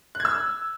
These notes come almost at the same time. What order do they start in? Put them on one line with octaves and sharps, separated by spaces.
F#6 G#6 E6